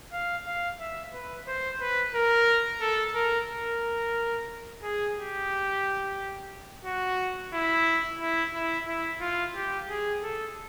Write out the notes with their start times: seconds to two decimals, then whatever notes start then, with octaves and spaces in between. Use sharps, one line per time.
0.12 F5
0.45 F5
0.80 E5
1.14 B4
1.47 C5
1.81 B4
2.15 A#4
2.81 A4
3.15 A#4
3.49 A#4
4.83 G#4
5.17 G4
6.85 F#4
7.53 E4
8.20 E4
8.54 E4
8.88 E4
9.21 F4
9.55 G4
9.89 G#4
10.23 A4